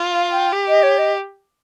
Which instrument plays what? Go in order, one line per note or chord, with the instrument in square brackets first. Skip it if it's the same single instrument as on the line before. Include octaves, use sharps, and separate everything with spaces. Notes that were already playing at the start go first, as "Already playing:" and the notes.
Already playing: [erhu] F4
[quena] F5
G5
[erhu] G4
[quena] D#5
C#5
D#5